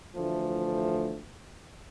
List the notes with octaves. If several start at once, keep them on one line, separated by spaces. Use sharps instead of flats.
D2 E3 F3 A3